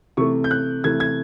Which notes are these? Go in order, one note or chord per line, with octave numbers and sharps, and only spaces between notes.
C3 E3 A3 C#6
G6
F#6
C3 E3 A3 G#6
G#6